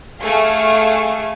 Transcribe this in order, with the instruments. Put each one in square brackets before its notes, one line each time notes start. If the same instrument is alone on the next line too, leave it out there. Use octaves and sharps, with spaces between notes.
[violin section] A3 G#4 F5 G#5 C#6